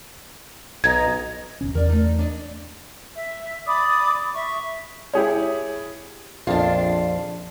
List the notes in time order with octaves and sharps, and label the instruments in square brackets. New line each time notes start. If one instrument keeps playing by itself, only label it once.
[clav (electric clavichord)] B1 [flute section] D#5 A#5 [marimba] G#6
[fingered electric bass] D1 G#1 C#4
[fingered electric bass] E2 [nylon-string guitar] A#4 D5
[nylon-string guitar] A3 D#4
D4 D5 D#5
[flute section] E5
D5 B5 D6 D#6
E5 C#6
[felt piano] E4 G4 G#4 C#5
[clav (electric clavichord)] A#1 F2 [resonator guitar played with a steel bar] D4 F4